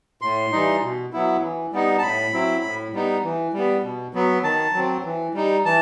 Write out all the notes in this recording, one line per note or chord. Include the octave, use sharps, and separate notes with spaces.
A2 C6
E3 G3 D#4
B2
F#3 B3 E4
E3
G3 B3 D#4
A5
A2 B5
F#3 C4 E4
A2
G3 B3 D#4
E3
G3
B3
B2
F#3 B3
D#3 A5
F#3 C4
E3
G3 D#4
E3 A5